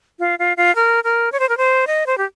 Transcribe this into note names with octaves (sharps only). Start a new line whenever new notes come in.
F4
F4
F4
A#4
A#4
C#5
C5
A#4
C5
D#5
C5
G4